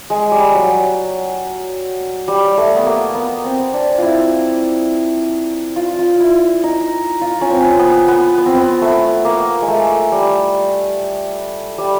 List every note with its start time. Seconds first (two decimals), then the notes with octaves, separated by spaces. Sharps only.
0.10 G#3
0.31 G3
0.54 F#3
2.28 G3
2.58 A3
2.76 B3
2.86 A#3
3.15 B3
3.44 C4
3.73 D4
3.98 E4 F4
5.76 F4
5.99 F4
6.20 E4
6.63 D#4
7.21 F4
7.41 C#4
7.50 C4
7.79 B3
8.08 B3
8.38 B3
8.46 C4
8.55 B3
8.82 A3
9.25 A#3
9.62 G#3
9.68 A3
10.12 G3
11.78 G3